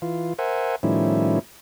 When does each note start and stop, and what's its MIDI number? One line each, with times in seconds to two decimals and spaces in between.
0.02 0.33 52
0.02 0.33 65
0.39 0.76 70
0.39 0.76 72
0.39 0.76 76
0.39 0.76 78
0.39 0.76 80
0.83 1.39 45
0.83 1.39 51
0.83 1.39 53
0.83 1.39 55
0.83 1.39 61
0.83 1.39 64